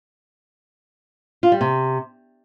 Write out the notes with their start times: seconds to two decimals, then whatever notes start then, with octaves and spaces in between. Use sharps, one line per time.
1.43 F4
1.52 G3
1.61 C3